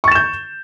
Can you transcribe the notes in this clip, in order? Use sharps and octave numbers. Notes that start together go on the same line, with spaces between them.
C#6 G6 A6 E7